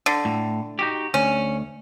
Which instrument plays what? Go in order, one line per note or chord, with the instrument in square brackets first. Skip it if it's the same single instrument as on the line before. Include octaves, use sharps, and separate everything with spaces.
[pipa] D3
[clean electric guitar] A2
D#4 F#4 G4
[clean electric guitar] D2 [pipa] C#4